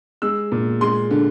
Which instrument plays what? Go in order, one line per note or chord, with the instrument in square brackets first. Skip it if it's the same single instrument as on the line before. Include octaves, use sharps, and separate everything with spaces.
[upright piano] G#3 E6
A#2
G#3 C6
D3